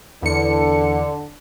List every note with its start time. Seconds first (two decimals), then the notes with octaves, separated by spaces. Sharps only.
0.22 E2 D3 C#7